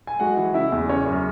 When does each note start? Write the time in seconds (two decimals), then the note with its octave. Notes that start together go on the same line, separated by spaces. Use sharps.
0.07 G#5
0.20 G#3 F#4 F#5
0.37 E3
0.54 C#3 E4 E5
0.72 E2
0.88 C#3 C#4 C#5
1.06 F#2